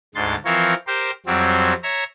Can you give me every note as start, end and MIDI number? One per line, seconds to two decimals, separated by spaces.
0.15 0.35 38
0.15 0.35 44
0.15 0.35 84
0.15 0.35 93
0.45 0.74 52
0.45 0.74 53
0.45 0.74 60
0.45 0.74 65
0.45 0.74 70
0.45 0.74 73
0.87 1.11 67
0.87 1.11 70
0.87 1.11 72
1.26 1.73 41
1.26 1.73 54
1.26 1.73 55
1.26 1.73 60
1.83 2.04 73
1.83 2.04 76
1.83 2.04 82